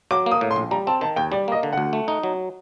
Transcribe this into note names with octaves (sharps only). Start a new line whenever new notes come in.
F#3 D6
A#3
D#6
A2
C6
A#1
G3 A#5
C4 A5
D#3 A5
D#2 G5
G3 D5
A#3 D#5
D3
D2 F#5
A3
D#4
F#3